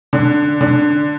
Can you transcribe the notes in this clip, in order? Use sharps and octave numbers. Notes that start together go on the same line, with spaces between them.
D3
D3